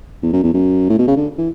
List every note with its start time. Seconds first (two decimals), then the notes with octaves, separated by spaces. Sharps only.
0.23 E2
0.33 F#2
0.43 E2
0.54 F#2
0.89 A2
0.98 B2
1.07 C#3
1.16 D3
1.38 E3